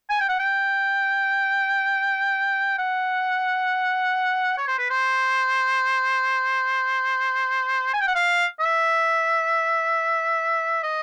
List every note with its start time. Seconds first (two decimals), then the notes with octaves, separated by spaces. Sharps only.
0.10 G#5
0.20 G5
0.29 F#5
0.39 G5
2.78 F#5
4.58 C#5
4.67 C5
4.78 B4
4.90 C5
7.93 G#5
8.00 G5
8.08 F#5
8.15 F5
8.60 E5
10.83 D#5